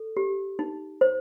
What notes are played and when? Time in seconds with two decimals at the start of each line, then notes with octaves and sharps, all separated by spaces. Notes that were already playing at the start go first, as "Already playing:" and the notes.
Already playing: A4
0.17 G4
0.59 D#4
1.01 C5